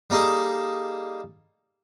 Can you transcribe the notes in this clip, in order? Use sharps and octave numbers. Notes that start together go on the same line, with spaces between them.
G3 A#3 D#4 G#4 A4